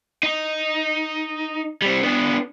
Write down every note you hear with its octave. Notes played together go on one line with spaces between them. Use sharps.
D#4
G3 C4
B3 D4